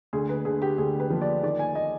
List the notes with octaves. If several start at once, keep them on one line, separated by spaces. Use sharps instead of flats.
D2 G#4
B4
D3 G#4
G4
D2 G#4
B4
F3
D5
D#3 D5
G#5
D#5